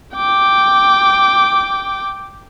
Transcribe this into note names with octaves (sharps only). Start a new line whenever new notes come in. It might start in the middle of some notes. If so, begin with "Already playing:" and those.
G5 D6